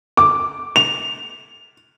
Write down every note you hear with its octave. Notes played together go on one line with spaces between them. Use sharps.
D6
F7